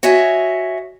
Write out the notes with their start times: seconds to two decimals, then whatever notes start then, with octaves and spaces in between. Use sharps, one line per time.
0.03 F#4 C#5 D#5 E5 G#5